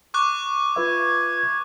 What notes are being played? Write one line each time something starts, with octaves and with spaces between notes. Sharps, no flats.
C#6 D6 F#6
F4 B4 E5 G#6